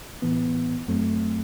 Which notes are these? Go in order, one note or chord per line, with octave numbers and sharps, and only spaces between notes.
A2 E3 B3
F#2 F#3 A3 C4